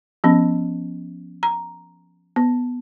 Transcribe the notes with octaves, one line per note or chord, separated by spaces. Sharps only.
F3 B3 C#4
A#5
B3